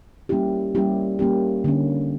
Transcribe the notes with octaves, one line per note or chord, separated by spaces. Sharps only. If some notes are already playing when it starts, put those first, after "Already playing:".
G3 A#3 C#4 E4 G4
G3 A#3 C#4 E4 G4
G3 A#3 C#4 E4 G4
D3 A#3 C#4